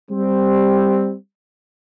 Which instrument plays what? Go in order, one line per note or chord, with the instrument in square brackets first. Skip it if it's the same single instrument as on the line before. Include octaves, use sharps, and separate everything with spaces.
[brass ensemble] G3 C4